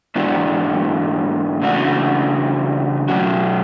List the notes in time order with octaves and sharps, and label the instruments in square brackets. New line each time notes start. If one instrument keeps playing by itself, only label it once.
[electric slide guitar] G#2 E3 B3 D4 F#4
C#3 E3 A3 D4 F#4
B2 F#3 C#4 F#4